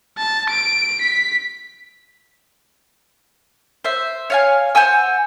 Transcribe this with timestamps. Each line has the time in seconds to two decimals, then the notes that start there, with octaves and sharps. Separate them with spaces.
0.18 A5
0.51 D7
1.02 B6
3.84 C5 E5
4.30 C#5 F5 G#5
4.75 C5 F#5 G#5 E6